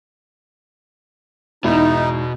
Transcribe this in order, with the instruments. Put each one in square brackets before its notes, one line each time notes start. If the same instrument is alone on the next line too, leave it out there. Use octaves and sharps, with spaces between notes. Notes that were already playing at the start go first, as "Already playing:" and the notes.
[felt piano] E2 G#2 [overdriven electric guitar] B2 [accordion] D#4 [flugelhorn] E4